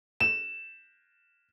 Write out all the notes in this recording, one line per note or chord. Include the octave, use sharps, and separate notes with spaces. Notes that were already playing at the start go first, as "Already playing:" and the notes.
E7